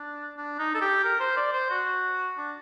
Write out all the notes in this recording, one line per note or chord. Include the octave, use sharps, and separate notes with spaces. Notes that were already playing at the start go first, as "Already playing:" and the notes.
Already playing: D4
D4
D#4
A4
G4
A#4
C5
D5
C5
F#4
D4